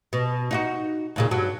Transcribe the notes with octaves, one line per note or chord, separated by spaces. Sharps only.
B2
D#4 F4 F#4
D#2 A#2 C#3
G2 F#3